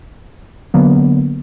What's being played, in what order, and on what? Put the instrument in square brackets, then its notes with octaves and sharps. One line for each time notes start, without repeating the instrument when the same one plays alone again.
[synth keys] D3 F#3 A#3 B3